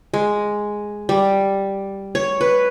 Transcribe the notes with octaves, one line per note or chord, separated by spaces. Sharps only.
G#3
G3
C#5
B4